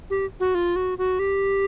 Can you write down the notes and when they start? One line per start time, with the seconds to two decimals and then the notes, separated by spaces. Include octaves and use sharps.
0.10 G4
0.40 F#4
0.55 F4
0.76 F#4
0.98 F#4
1.19 G4